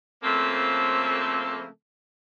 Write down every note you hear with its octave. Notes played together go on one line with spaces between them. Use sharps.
C#3 F3 A3 A#3 C4 A4